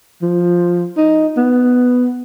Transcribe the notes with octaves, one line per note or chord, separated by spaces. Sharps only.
F3
D#4
B3